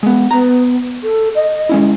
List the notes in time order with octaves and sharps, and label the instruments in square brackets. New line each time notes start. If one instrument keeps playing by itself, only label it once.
[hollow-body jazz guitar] G#3 B3
[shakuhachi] B3 [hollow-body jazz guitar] A#5
[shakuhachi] A4
D#5
[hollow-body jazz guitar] G#3 C#4 E4